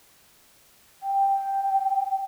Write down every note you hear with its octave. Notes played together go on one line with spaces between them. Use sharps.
G5